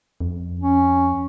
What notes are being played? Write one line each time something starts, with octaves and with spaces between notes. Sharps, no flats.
F2
C#4